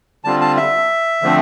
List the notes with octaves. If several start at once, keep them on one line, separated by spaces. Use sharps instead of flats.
D3 G3 C4 F4 A5
A5
E5
D3 F3 A3 C4